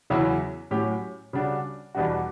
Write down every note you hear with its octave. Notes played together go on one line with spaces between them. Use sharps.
E2 C#3 F#3 C#4 E4
A2 F#3 C#4 G4
C#3 G3 D4 F#4
E2 B2 G3 D4 F#4